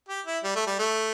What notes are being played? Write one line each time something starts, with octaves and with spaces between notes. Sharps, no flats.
G4
E4
G3
A3
G3
A3